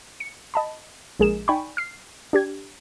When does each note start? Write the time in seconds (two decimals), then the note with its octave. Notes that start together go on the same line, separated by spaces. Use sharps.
0.20 C#7
0.54 D#5 A5 B5
1.19 A#1 G#3 G#4 A#4 E7
1.48 D#4 D5 G5 G#5 B5 C#6
1.77 F6 C7
2.33 D4 G4 G#6